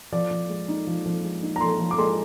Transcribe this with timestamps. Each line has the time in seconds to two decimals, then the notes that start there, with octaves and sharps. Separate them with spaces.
0.12 F3 D5
0.31 F3
0.50 G#3
0.68 D#4
0.87 F3
1.06 F3
1.24 G#3
1.43 D#4
1.56 A#5
1.61 F3 C6
1.80 F3
1.91 D6
1.98 G#3 C6